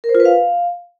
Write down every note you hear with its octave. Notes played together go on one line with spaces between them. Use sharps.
A#4
C5
F4
B4
F5